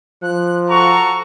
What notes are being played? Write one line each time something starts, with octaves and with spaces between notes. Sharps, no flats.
F3 F#6
F#4 A4 A#5 C#6